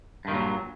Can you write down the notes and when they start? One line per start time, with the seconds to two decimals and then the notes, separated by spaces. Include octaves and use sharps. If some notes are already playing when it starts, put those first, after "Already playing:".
0.25 G2
0.28 D#3
0.31 A#2
0.35 F#3